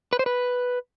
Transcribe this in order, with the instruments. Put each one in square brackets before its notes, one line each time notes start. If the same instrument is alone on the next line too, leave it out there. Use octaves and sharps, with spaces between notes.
[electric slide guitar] B4
C5
B4